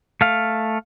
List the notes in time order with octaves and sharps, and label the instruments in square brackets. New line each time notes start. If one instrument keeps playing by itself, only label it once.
[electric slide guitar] A3 F5